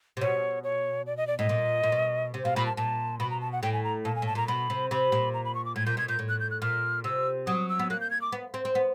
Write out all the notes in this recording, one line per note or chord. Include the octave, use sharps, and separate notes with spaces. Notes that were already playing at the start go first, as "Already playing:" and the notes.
C3
B2 C#5
C#5
D5
D#5
D5
A2 D#5
A#2
A#2
B2
C3
B2 F5
A#2 B5
A5
A#2 A5
B2 B5
A#5
A5
F#5
A2 G5
G#5
A#5
A#2 A5
G#5
A2 A5
A#2 A#5
B2 B5
C3
C3 B5
A#2
A#5
B5
C#6
D6
A2 G#6
A#2 G6
B2 G#6
A#2 G6
A2
F#6
G6
F#6
A#2 F6
C3 E6
F#3 D#6
E6
B3
A#3 F#6
G6
G#6
D6
B3
C4
C4
B3